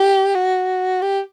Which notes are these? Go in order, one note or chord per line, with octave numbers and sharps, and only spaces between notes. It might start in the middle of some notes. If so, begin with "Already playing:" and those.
Already playing: G4
F#4
G4